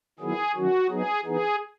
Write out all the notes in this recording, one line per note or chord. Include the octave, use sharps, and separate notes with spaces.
D#3 F#3 B3 E4 G#4
D#3 F#3 C#4 F#4
F#3 B3 D#4 G#4
E3 B3 D#4 G#4